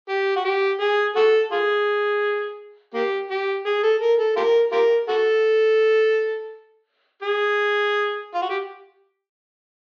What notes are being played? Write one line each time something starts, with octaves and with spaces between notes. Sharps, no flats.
G4
F#4
G4
G#4
F#4 A4
F4 G#4
A#3 G4
G4
G#4
A4
A#4
A4
F4 G4 A#4
F4 G4 A#4
F#4 A4
G#4
F4
F#4
G4